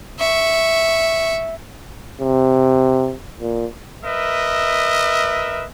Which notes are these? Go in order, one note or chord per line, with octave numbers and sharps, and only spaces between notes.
E5 C#6
C3
A#2
A#4 B4 D#5 E5